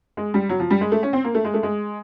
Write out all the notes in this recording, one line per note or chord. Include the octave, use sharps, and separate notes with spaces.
G#3
G3
F#3
F3
G3
G#3
A3
C#4
C4
A#3
A3
G#3
A3
G#3